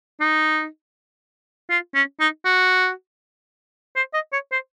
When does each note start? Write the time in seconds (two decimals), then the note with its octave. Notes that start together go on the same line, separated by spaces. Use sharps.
0.20 D#4
1.70 F4
1.95 C#4
2.20 D#4
2.45 F#4
3.96 C5
4.14 D#5
4.32 C#5
4.52 C5